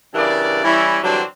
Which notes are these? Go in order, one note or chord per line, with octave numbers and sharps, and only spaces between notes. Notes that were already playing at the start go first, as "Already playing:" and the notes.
G2 C#3 E3 A#4 D5
E3 G3 C#4 E4
D3 E3 F#3 G3 C4 D4